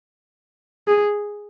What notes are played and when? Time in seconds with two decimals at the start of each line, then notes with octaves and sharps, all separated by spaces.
0.88 G#4